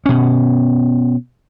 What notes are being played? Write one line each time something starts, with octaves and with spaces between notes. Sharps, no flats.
B2 C#4